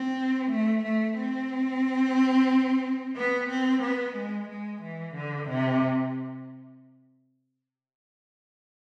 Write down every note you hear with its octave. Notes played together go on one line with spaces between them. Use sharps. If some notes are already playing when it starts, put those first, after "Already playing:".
Already playing: C4
A3
A3
C4
B3
C4
B3
G#3
G#3
E3
D3
C3